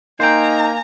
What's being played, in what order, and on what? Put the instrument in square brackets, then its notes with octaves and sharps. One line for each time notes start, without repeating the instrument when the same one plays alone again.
[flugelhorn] A#3 [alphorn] D#4 [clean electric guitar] C5 G5 [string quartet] G#5 A#5